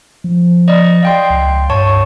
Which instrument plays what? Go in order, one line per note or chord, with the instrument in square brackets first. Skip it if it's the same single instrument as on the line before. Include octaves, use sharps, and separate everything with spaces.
[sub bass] F3
[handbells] D5 D#5
F5 G5 C6
[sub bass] C#2
[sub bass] G2 [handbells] C#5 A5 C#6